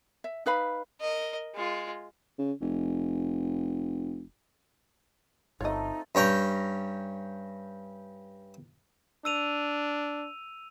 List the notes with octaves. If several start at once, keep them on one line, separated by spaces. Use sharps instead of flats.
E5
D#4 B4 F5 B5
A#4 D#5
G#3 F4
C#3
F1
G1 A3 C4 D#4 F4 C#5 D#5
G2 C#4 G5 A#5
D4 E6 D#7 F7